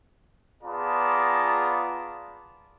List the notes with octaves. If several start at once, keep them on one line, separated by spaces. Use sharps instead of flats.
B3 F4 G#4 D5 A5 A#5